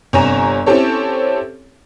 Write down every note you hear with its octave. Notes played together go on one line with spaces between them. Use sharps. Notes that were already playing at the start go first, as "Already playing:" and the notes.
G1 C3 C#5 G#5 A#5 E7
C4 C#4 E4 G4 A4 C#5